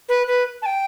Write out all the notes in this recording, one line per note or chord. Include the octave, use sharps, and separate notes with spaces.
B4
B4
A5
G5